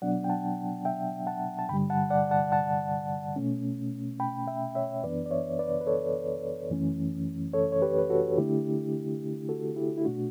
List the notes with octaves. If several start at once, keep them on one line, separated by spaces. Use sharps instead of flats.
B2 F#3 B3 D4 D5 F#5
G5
F#5 A5
E5 G5
F#5 A5
A5
G2 D3 G3 G5 B5
F#5 A5
D5 F#5
F#5 A5
F#5 A5
B2 A3 C#4
G5 B5
E5 G5
C#5 E5
F#2 E3 B3 D4 B4 D5
D5
C#5 E5
B4 D5
B4
A4 C#5
F#2 E3 A3 C#4
A4 C#5
C#5
G4 B4
B4
F#4 A4
D3 A3 D4 E4 G4
F#4 A4
E4 G4
E4
B2 A3 D4 F#4